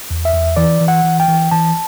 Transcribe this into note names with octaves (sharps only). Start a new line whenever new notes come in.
E2
E5
E2
E3 D5
E3
F#5
E3
G5
E3
E3 A5